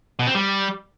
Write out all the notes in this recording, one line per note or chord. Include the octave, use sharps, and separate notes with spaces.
B2
C4
G3